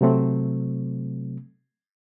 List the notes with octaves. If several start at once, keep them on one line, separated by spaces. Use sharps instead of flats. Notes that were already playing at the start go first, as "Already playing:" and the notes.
C3 F#3 A3 C4